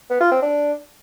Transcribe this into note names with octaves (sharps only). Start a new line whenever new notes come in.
B3
F4
C4
D4